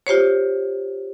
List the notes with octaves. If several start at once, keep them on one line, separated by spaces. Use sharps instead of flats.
F4 G4 C5 C#5